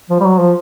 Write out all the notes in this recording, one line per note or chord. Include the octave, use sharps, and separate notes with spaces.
F3
G3
F#3
F3